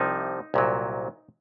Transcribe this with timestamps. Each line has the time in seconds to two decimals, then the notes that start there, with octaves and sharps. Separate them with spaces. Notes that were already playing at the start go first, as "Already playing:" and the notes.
Already playing: C2 C3 F3 D#4
0.54 C2 A#2 F#3